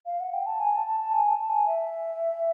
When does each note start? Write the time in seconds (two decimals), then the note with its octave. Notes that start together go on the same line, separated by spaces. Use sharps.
0.06 F5
0.20 F#5
0.33 G5
0.46 A5
0.60 G#5
0.73 A5
0.87 A5
1.00 A5
1.13 G#5
1.31 A5
1.49 G#5
1.67 E5